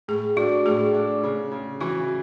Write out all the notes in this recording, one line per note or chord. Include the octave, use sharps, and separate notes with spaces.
A2 G#4
D4 F#4
A2 G#4
D4
C#3
C#3
E3 F#4